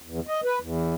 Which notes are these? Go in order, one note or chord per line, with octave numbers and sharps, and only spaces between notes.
E2
D#5
B4
E2